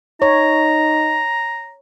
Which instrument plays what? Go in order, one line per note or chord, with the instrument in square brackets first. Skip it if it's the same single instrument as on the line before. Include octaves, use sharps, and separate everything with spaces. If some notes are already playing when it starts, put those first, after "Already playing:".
[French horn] D#4 [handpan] C#5 [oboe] A#5